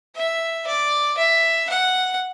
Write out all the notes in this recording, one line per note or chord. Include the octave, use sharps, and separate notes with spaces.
E5
D5
E5
F#5